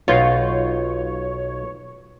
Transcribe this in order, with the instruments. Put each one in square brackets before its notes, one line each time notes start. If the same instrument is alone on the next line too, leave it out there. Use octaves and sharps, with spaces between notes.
[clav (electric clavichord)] B1 D#4 F#5 [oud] F4 [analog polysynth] C#5